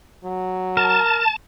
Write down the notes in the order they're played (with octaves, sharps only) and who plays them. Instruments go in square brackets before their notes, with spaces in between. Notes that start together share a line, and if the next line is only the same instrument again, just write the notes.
[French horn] F#3
[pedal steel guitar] A#4 [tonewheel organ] A5